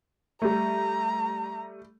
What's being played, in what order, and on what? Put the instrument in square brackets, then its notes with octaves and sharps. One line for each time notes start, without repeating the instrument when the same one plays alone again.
[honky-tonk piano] G3 A3 [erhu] A#5